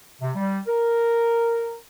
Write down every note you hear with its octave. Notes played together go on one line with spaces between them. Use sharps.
C3
G3
A#4